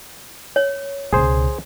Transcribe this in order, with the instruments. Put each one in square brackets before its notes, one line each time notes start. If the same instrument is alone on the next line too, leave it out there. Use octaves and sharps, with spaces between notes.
[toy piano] C#5
[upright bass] C#2 B2 [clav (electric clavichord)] G#4 C5